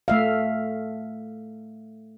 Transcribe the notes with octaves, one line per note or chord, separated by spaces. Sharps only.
A3 E5 F5